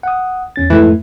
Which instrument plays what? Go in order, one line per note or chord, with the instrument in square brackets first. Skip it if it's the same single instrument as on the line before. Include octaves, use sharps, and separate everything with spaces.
[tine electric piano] F#5 D#6
E2 C#4 A6
[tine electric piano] F2 G#2 A3 [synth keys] E3